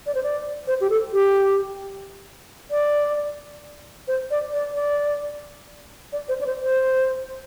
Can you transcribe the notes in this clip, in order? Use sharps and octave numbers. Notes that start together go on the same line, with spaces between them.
D5
C5
D5
C5
G4
A4
G4
D5
C5
D5
D5
D5
D5
C5
D5
C5
C5